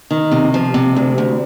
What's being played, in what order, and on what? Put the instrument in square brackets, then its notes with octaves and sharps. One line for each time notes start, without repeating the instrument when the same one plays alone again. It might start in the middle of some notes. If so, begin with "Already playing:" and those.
[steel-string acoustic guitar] D#3
C3
F3
C3
D2
D2